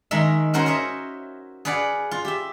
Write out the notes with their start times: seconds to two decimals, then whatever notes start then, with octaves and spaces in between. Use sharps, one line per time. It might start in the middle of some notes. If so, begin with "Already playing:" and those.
0.11 D#3 G#3 A#4 E5
0.53 C#4 F#4 A#4 C5 C#5
0.66 A#4 C5 C#5 D#5 E5
1.65 G#4 B4 D5 F5 F#5
2.11 F4
2.25 G4 E5